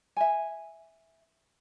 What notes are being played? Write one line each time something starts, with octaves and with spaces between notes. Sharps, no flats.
E5 G#5